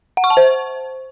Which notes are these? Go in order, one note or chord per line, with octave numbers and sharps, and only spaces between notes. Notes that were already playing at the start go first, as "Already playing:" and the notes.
F#5
C#6
A5
C5